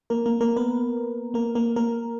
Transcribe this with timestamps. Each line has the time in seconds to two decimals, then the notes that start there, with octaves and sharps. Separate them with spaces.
0.10 A#3 A#4
0.26 A#3 A#4
0.40 A#3 A#4
0.56 B3 B4
1.34 A#3 A#4
1.55 A#3 A#4
1.76 A#3 A#4